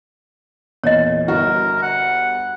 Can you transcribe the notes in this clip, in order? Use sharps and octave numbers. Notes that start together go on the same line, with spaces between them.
E2 A#2 C#5 D#5
G1 F#4 A#4
F#5